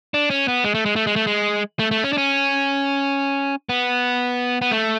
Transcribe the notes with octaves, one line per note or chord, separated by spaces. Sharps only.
D4
C#4
B3
G#3
A3
G#3
A3
G#3
A3
G#3
A3
A3
C#4
D4
C#4
B3
B3
A3